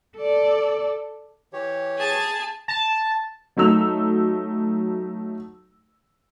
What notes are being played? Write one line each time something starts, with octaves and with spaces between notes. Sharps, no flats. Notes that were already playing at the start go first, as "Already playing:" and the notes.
A4 D5
E3 G4 C#5
G#4 A5
A5
F#3 A3 D#4 E6 F7